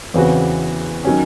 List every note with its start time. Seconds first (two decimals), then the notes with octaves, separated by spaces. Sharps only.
0.14 E2 C#3 E3 C4 F#4
1.05 D#3 F#3 C#4